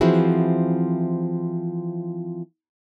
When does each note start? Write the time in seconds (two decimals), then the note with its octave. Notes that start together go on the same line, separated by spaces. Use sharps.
0.01 E3 F3 C4 E4 F#4 G#4